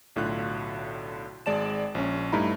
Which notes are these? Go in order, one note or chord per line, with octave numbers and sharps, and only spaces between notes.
B1 A2 D3 F4 F#6
G#1 G#3 D5 A5 E7
A#1 C#4
G2 A3 D#4 E4 A#5 B5